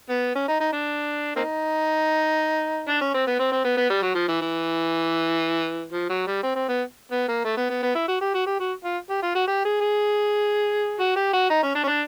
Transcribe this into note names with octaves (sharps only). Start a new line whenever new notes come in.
B3
C#4
D#4
D#4
D4
A#3 C4 D#4
D4
C#4
C4
B3
C4
C4
B3
B3
G3
F#3
F3
E3
E3
F3
F#3
G3
C4
C4
B3
B3
A#3
A3
B3
B3
B3
E4
F#4
G4
F#4
G4
F#4
F4
G4
F4
F#4
G4
G#4
G#4
F#4
G4
F#4
D#4
C#4
D4
C#4
D4